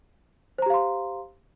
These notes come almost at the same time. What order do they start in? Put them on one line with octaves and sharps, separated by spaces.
C5 A#5 G4 F5 C6